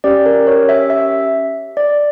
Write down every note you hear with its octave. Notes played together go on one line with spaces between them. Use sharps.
C#4 G4 D5
A#4
C#5
E5
E5
D5